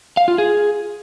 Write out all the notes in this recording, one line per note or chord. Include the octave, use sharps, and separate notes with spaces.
F5
F4
G#4